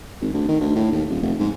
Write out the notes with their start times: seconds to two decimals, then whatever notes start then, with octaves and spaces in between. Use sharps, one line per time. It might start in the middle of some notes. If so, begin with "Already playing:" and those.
0.21 G#1
0.34 D2
0.49 D#3
0.61 D2
0.76 A2
0.92 D#2
1.10 D#1
1.23 F1
1.39 G#2